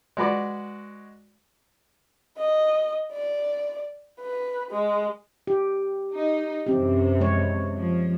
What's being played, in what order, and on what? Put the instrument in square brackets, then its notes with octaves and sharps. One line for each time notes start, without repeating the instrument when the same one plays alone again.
[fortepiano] G#3 F#4 B4 D5
[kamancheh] D#5
D5
B4
G#3
[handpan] G4
[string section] D#4
[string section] F#2 C3 E3 [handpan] C4 G4
[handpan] G#3 C#5
[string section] F3